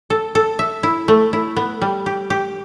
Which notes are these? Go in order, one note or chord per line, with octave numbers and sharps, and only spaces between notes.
A4
A4
E5
E4
A3
E4
B3
G3
G4
G4